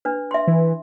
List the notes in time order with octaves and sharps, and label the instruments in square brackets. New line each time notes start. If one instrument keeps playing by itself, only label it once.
[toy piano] D4 B4
E5 C6
[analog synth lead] E3